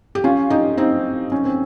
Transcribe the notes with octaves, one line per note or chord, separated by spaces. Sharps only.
G4
C#4 F4
D#4 G4
C4 D#4
C#4
C4